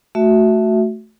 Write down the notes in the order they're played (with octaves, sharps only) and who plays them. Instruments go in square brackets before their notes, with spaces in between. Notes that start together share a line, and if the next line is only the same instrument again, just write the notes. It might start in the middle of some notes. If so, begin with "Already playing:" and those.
[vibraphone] A3 F#4 E5